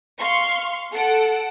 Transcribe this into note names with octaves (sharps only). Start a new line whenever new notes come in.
F5 C6 C#6
A4 F#5 D7